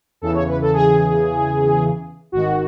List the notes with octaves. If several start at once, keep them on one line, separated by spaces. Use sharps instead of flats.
E2 C#3 E3 A4
C#5
B4
A4
G#4
G#1 G#2 D#3 F#4